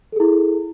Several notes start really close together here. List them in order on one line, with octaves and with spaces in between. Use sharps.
A4 G#4 E4